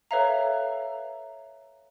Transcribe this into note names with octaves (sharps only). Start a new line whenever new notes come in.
A4 B4 C#5 E5 F5 A#5